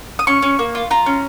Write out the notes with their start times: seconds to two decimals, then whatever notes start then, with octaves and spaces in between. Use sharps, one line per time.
0.19 D#6
0.27 C#4 C#6
0.42 C#4
0.59 A#3
0.75 F4
0.91 F4 A#5
1.06 C#4